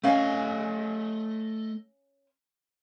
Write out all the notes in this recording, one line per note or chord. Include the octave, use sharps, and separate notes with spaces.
A3 C#4 D#5 F5 G#5